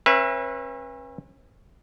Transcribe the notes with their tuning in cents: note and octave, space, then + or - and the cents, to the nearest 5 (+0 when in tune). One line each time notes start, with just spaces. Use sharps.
C#4 -40 B4 -25 E5 +15